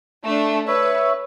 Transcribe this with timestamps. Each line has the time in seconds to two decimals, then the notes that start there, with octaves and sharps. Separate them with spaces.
0.24 A3 D4
0.67 B4 C#5 E5